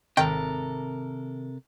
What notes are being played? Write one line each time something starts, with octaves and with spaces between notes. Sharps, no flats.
G#1 C3 D#3 A4 A#4 G5